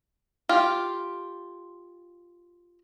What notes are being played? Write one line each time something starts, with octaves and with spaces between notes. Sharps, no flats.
F4 G4